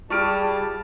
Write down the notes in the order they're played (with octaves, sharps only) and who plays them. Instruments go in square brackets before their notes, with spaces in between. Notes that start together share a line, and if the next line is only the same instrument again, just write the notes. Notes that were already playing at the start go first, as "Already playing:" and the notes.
[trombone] G3 [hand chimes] F4 [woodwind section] G#4 A5 [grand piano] C#6 F6 D7